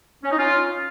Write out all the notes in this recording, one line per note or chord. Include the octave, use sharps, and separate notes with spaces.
C#4
D#4
C#4 F4